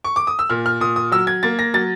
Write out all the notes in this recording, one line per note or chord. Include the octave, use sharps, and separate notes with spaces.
C#6
D6
D#6
E6
A#2 F6
F6
A#2 D#6
D#6
F#3 E6
G#6
A#3 A6
A#6
F#3 A6